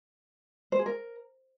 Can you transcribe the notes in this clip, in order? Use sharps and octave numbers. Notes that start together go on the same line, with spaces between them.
C5
G#4
A#4